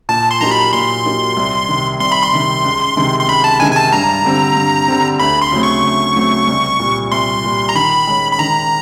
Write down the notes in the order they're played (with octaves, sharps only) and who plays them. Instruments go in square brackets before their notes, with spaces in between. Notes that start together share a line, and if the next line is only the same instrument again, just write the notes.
[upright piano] A#2 [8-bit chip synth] A5
[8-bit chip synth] C6
[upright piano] F#3 A#3 D#4 G4 [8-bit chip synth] A#5
[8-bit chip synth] B5
[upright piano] A#2 [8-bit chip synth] C6
[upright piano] F#3 A#3 D#4 G4
C2
C3 D#3
[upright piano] C2 [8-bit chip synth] C6
[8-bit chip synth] B5
C6
[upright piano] C3 D#3
C#2
C3 D#3 G#3
[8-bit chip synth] C6
[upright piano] C#2 [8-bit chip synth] B5
[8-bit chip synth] A5
[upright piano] C3 D#3 G#3 [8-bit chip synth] G#5
[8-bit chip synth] G#5
A5
[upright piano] G2 [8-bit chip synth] A#5
[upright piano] D3 G3 C4
G2
D3 G3 C4
[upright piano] D2 [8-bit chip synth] B5
[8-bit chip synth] C6
[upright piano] C#3 F#3 A3 C4
[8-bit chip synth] C#6
[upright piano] D2
C#3 F#3 A3 C4
C2
A#2 G3
[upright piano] C2 [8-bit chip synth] C6
[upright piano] A#2 G3
[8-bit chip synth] A#5
[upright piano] D#3 [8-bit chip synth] B5
[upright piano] G#3 C#4
[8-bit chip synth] B5
[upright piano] D#3 [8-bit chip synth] A#5